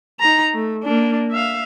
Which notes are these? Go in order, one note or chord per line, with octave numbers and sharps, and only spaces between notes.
D#4 A#5
A3
A#3 D4
E5 F5